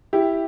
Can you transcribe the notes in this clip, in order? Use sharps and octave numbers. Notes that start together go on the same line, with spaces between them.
E4 G4